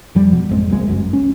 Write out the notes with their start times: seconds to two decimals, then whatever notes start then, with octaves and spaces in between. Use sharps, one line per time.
0.15 F2 F3 G3
0.32 B2
0.49 G#1 F2 G#3
0.70 F#1 C#2 G#3
0.88 G1 C#2 F#2
1.13 C#4